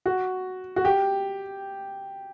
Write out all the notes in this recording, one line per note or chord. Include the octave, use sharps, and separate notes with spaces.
F#4
F#4
G4